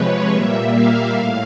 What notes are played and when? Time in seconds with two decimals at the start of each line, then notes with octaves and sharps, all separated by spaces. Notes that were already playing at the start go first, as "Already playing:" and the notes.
Already playing: C3 F3 G#3 B4 C#5
0.31 A#2 G3 A#3 E5
0.73 F5
1.15 A2